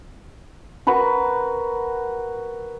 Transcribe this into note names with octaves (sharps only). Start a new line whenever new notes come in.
F#4 A#4 B4 C#6